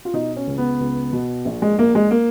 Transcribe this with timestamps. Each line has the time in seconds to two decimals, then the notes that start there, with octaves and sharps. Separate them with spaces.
0.05 F4
0.13 B2 D#4
0.36 C#4
0.47 C#2
0.58 B3
0.80 C#2
1.13 B2
1.45 A#1
1.62 G#3
1.78 A#1 A#3
1.95 G#3
2.11 A#3